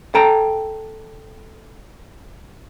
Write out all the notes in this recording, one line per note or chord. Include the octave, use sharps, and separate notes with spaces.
A4 G5 A#5